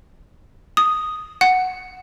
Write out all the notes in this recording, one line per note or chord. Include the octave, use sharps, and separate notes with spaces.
D#6
F#5